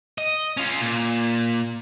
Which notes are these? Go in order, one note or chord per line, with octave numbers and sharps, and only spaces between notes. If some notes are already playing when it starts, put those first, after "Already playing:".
D#5
C#4 F4
A#2